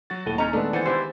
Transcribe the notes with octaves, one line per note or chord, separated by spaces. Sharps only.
F#3 F#4 A6
D#1 A2 D#7 G7
C#4 D#4 C5 A#5
D#3 G#3 A3 B3 D4 A4
E3 C5 F#5 G#5 A6
E3 E4 G4 C5